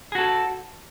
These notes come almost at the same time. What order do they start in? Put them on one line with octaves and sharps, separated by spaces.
G#4 F#4 A4